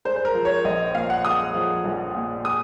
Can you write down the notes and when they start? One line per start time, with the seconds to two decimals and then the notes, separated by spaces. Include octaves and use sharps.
0.05 G#3 C5
0.16 C5
0.25 A#4
0.35 F3
0.45 C#5
0.64 A#1 D#5
0.95 A#2 F5
1.10 F#5
1.25 G#3 D#6
1.54 F3
1.84 A#1
2.15 A#2
2.44 G#3 D#6